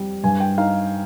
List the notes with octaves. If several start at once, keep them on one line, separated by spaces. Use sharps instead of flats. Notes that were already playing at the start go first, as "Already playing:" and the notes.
Already playing: F2 G3
G2 G#5
G5
D#4 F5